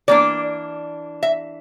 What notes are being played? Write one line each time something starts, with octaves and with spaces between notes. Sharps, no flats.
E3 A#3 D4 D5
E5